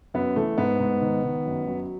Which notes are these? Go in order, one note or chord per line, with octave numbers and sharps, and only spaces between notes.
F#2 B3
E3 A3
G#2 B3
G#2
D#3
D#3
F#2
F#3